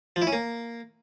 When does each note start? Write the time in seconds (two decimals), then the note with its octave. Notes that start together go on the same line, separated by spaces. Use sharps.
0.16 F3
0.22 E4
0.27 C#4
0.33 A#3